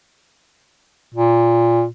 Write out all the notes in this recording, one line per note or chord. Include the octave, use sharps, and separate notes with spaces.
A#2